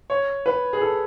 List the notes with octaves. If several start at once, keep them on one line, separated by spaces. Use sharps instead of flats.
C#5
B4
G#4
A4